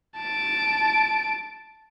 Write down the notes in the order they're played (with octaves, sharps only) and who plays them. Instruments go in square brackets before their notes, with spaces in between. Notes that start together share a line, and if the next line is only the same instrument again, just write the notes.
[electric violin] A5 D7